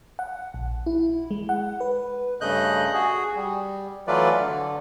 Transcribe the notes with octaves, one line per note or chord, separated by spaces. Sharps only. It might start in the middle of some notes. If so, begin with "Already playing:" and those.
F#5
A#1
E4
G#3
F#5
B4
G2 C#3 A3 D#5 F#6 G6
F#4 G#4
G3
E3 F#3 A3 F4 B4 D5
D3